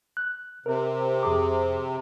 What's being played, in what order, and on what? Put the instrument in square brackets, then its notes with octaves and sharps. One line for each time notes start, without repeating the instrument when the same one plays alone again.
[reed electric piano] F#6
[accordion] C3 [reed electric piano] A#4
[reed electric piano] F2 G#4 D6